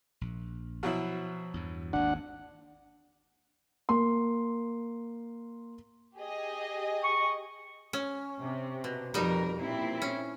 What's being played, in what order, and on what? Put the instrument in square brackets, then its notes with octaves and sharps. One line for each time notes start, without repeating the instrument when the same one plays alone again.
[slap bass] A#1
[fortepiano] B2 F#3 E4 [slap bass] F3
[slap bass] E2 G2
[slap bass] G#1 D#2 G#2 [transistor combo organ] D4 F#5
[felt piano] A#3 C6
[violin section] G4 G#4 D#5
[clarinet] C#6
[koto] C#4
[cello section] C3
[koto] B2
[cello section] F2 A#4 [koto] G3 D#4
[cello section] A#2 C4 E4
[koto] C#4